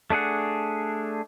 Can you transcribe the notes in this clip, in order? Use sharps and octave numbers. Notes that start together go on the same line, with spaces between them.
A3 D4 G#4 F#5